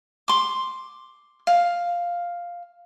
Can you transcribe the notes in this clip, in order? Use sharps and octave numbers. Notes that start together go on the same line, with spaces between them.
C6 D6
F5